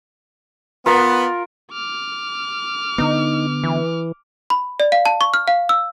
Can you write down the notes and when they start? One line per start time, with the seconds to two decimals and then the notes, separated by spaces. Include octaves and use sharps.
0.86 B3 F4 A#4
1.72 D6 F6
2.98 D3 B3 D#4
3.64 E3
4.50 B5
4.80 D5
4.92 F5
5.05 A5
5.21 C#6
5.34 F6
5.48 F5
5.69 E6